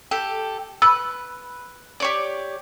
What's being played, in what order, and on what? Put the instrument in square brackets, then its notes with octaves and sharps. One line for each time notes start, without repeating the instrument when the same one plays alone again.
[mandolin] G4 A4
[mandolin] B4 [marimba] E6
[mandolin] G4 C#5 D5